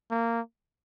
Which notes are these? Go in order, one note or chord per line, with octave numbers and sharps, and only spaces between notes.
A#3